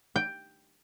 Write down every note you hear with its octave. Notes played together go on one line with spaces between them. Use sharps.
G5